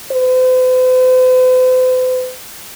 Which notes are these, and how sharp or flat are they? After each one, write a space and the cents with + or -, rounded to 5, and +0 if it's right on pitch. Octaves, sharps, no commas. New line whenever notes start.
C5 -45